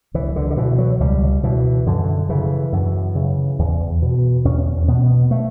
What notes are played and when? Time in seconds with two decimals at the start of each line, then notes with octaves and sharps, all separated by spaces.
0.14 C#2 E3
0.36 D3
0.50 D3
0.57 B2 E3
0.78 F#3
1.00 C#2 G3
1.43 B2 E3
1.86 F#2 D3
2.29 C#3 E3
2.72 F#2
3.15 C#3
3.59 E2
4.02 B2
4.45 E2 C#4
4.88 B2 B3
5.31 A3